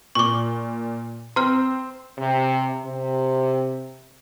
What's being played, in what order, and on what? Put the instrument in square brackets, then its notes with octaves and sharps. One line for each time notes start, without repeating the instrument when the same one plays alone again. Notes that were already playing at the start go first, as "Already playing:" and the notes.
[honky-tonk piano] A#2 [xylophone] C#6 D6
[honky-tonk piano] C4 [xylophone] A#5 F6 [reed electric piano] C6
[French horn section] C3
C3